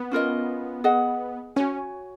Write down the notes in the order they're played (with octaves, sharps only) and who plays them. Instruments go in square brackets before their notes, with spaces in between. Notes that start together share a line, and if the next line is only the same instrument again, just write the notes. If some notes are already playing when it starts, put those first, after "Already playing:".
Already playing: [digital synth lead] B3
[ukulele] C#4 F4 A#4 D#5
G#4 D#5 F#5
[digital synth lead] C#4 [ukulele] F#4 C#5 G#5